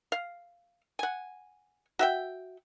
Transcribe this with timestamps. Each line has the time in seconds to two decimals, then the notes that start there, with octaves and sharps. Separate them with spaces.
0.12 F5
0.99 F#5 G#5
1.99 F#4 E5 G5